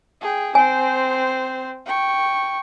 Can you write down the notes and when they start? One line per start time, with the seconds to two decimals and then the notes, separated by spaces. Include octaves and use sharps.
0.21 G#4 G5
0.55 C4 C5 G#5
1.86 G5 C#6